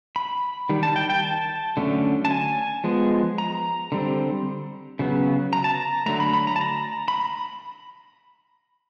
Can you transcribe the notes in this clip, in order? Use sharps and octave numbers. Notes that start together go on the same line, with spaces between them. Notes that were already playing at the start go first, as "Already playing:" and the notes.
B5
D#3 G3
A5
G5
G5
A5
D3 F#3 A3 C#4
A5
G#5
F3 G#3 B3
A#5
D3 G3 C4
C#3 F#3 B3
A#5
A5
A#5
D3 F#3 A3 A#5
B5
B5
A#5
A5
A#5
B5